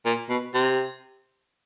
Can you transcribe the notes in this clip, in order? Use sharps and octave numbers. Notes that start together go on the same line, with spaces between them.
A#2
B2
C3